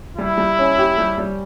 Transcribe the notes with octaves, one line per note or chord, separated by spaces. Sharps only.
G3 E4
G3
C#4
G4
G3
G3